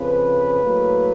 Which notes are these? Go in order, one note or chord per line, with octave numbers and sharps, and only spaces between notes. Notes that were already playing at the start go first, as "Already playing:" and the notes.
Already playing: F2 C#3 F3 B4
A2 F#3 A#3